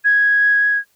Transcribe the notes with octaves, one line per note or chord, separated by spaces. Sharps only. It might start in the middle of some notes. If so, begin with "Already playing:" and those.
G#6